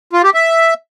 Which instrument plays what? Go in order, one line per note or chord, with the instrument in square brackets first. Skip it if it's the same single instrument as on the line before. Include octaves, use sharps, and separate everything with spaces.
[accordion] F4
G4
E5